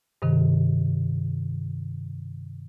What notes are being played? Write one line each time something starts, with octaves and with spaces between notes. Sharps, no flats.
G2 C3 D#3